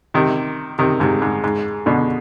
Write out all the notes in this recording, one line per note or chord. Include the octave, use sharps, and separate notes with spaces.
C3 D#3
C3 D#3
G#2 C3
G#2
G#2
B2 D3